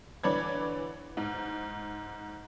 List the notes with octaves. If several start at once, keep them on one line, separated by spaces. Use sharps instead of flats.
D3 E3 C#5 D5 B5 G#6
G#2